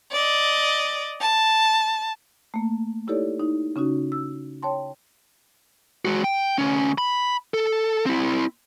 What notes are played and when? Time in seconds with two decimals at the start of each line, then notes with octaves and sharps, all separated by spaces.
0.12 D5 D#5
1.21 A5
2.54 A3 A#3
3.07 D#4 E4 G4 A4 C#5 D5
3.40 D#4 E4
3.76 C#3 C#4 D#4 F#4
4.12 E6
4.63 C#5 G5 A5 C6
6.05 G#3 F#4
6.24 G5
6.58 D2 C#4
6.98 B5
7.54 A4
8.06 C4 E4